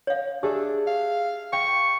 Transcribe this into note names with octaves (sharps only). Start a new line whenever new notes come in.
C#5 F5
D4 G4 G#4 E5
F5
F5 G5 C#6